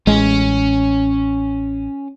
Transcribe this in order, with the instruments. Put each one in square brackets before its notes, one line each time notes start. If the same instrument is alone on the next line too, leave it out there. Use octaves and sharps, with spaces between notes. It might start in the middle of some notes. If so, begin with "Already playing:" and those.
[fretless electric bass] A1 G#3 [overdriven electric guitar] C#4